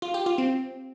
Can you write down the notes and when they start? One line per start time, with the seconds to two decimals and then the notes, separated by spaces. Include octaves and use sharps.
0.02 F4
0.14 G4
0.26 F4
0.38 C4